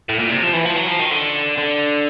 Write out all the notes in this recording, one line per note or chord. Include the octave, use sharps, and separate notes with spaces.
A2
A#2
C3
F3
E3
F3
F#3
F3
D#3
D3
D3